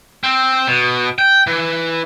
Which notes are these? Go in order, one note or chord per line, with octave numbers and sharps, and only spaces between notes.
C4
B2
G5
E3